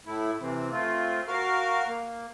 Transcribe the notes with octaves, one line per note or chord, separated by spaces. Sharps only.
A2 A3 E4
C3 E3 C4
A3 C4 F4
F#4 A#4 F5 F6
A#3